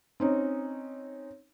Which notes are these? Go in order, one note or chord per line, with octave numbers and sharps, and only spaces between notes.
C4 C#4 D#4